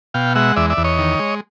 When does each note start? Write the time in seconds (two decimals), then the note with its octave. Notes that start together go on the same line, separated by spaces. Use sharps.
0.14 B2 F5 G5
0.35 G#3 E5 F#5
0.56 E2 D5 E5
0.70 D5 E5
0.77 E2
0.84 C#5 D#5
0.98 D#3
1.19 G#3